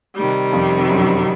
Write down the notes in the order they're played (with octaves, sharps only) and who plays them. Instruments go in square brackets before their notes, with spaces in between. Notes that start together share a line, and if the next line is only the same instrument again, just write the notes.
[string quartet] C3 D#3 G3
[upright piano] F2 F3
F#2 F#3